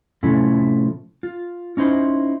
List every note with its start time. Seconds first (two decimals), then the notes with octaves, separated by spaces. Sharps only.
0.23 A2 C3 F3 A3 C#4 E4
1.23 F4
1.77 C#4 D#4 E4 C5